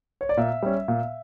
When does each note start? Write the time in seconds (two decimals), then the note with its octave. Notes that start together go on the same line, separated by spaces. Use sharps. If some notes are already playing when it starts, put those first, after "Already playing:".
0.21 C#5
0.29 D5
0.37 A#2 E5
0.63 G3 C#4
0.88 A#2